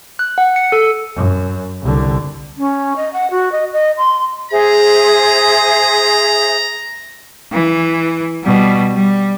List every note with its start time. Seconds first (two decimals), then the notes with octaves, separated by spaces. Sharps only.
0.19 F#6
0.38 F#5
0.56 C#7
0.72 A4
1.16 F#2
1.82 C2 D3
2.57 C#4
2.96 D#5
3.13 F#5
3.30 F#4
3.52 D#5
3.73 D#5
3.97 C6
4.51 G#4 C5 E5 A#5
7.52 E3
8.43 B2 G3
8.96 G3